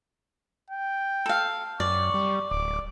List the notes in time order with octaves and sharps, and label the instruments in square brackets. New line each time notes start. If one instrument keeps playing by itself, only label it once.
[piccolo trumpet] G5
[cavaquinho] A4 F5
[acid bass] F#2 [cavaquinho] D5 [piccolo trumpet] C#6
[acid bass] G3
[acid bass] D1 [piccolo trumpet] D6